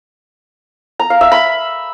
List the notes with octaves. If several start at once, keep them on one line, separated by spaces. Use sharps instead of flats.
A#5
F5
E5
B5